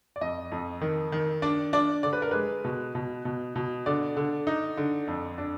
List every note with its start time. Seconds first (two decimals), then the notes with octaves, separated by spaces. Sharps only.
0.16 D5
0.21 F2 D#5
0.52 F2
0.81 D#3
1.12 D#3
1.42 D4 D5
1.73 D4 D5
2.03 D3 D5
2.13 B4
2.22 A#4
2.31 G#3 B4
2.64 B2
2.95 B2
3.25 B2
3.56 B2
3.86 D3 D5
4.17 D3
4.47 D#4
4.77 D3
5.08 F2
5.38 D4